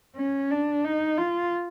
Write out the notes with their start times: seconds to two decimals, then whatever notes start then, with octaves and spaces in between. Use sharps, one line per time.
0.16 C#4
0.51 D4
0.85 D#4
1.18 F4